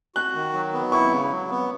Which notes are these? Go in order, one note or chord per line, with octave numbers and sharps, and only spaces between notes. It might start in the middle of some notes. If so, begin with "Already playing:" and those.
F#4 F#6
D#3
F#3
B3
E4 C#6
C#3
F#3
B3